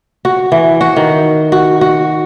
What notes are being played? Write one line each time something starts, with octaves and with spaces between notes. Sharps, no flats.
F#4
E3
F#4
D#3
F#4
F#4